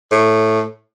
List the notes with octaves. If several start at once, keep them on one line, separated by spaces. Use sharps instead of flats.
A2